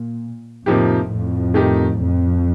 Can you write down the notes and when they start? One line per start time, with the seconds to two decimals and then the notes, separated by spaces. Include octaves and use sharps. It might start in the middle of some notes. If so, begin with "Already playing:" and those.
Already playing: A#2
0.66 F2 A2 C3 F3 A#3 D#4 G4
1.10 F2 A2
1.54 D#3 A3 D#4 G4
1.98 F2